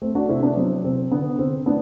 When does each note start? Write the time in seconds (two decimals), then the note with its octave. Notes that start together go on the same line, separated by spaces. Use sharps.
0.02 A3 C4
0.15 D4 F#4
0.29 C3 C4 E4
0.43 B3 D4
0.56 F#3 C4
0.84 C3 C4
1.11 D3 B3
1.38 D3 C4
1.66 A3 B3 D4